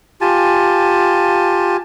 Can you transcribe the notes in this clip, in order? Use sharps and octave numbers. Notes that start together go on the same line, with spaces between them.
F4 G4 G#5 A5